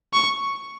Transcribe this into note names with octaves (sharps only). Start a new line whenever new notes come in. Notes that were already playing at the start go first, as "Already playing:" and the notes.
C#6